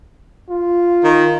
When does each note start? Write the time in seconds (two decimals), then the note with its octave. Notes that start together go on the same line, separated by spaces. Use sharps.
0.49 F4
1.04 D#3